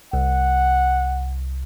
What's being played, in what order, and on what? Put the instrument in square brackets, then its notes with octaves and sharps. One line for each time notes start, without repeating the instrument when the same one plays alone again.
[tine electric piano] C2 [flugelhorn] F#5